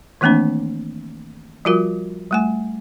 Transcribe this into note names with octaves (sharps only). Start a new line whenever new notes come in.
D#3 E3 A3 A#3 C4 D4
F3 G3 F4 F#4 A#4
G3 A3 G#5